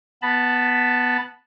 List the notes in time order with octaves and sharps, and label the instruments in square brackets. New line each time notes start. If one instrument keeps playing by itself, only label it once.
[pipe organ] B3 A5 B5